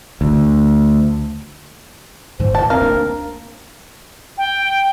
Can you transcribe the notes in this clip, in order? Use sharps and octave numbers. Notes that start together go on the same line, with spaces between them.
D2
F1 G#2 D3 C5
D#2 A#2 A5
F2 C4 A#4 F5
D2 A#3 D4
G5